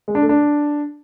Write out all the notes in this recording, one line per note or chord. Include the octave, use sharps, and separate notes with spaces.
G#3
D4
A3
D4